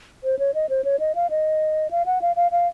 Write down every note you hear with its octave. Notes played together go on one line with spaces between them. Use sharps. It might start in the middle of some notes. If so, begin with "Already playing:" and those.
C5
C#5
D#5
C5
C#5
D#5
F5
D#5
F5
F#5
F5
F5
F5